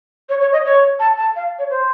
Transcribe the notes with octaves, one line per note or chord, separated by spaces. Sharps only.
C#5
C#5
D#5
C#5
A5
A5
F5
C#5
C5